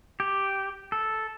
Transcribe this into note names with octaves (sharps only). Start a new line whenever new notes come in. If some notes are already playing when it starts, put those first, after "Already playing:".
G4
A4